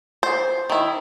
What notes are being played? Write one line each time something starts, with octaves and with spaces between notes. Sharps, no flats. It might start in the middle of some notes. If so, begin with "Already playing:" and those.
C5
D#3 E4